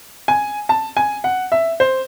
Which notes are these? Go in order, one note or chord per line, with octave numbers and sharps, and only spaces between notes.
G#5
A5
G#5
F#5
E5
C5